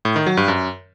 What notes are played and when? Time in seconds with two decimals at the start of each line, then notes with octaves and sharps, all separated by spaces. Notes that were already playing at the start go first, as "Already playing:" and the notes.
0.05 A2
0.16 D#3
0.27 F#3
0.37 G2
0.48 F#2